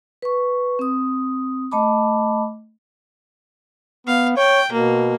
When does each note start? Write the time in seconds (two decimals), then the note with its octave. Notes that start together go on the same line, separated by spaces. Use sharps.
0.22 B4 C#6
0.79 C4 D#6
1.72 A3 D#5 A5 B5 D6
4.07 B3 F5
4.37 C#5 G5
4.72 B2 A#3